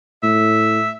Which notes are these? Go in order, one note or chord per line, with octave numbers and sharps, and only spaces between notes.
A2 E5